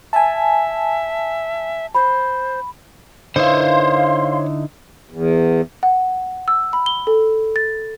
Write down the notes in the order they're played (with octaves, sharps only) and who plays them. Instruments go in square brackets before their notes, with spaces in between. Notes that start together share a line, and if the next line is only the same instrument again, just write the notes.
[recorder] E5 [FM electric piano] G#5 A5
[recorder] C5 [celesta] B5
[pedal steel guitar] D3 D#4 E4 [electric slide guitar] C5 C#5 [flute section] F5 C6
[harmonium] E2
[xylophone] F#5
E6
B5
G7
A4
A6